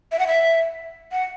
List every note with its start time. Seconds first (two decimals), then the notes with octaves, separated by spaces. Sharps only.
0.12 E5
0.19 F#5
0.27 E5
1.12 F#5